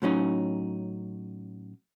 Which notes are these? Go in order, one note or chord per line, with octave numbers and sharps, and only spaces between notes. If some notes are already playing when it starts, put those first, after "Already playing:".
A2 F#3 C#4 D#4